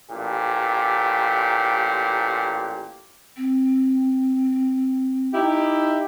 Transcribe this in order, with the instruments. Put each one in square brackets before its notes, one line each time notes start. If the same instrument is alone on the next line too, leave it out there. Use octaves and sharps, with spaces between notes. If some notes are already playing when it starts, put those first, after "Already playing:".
[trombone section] A1 A#2 G4
[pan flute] C4
[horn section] D#4 E4 G4